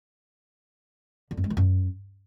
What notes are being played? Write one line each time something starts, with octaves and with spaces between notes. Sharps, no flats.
D3
F#2
G#3
D#3
F#2